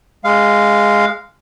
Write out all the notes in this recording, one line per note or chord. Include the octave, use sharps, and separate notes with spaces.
G#3 F5